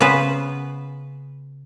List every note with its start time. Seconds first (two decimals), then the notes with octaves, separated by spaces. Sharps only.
0.01 C#3 B3 B4 C5